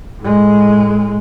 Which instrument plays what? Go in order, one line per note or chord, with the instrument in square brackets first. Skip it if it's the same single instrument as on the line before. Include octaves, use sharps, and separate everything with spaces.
[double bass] A2 G#3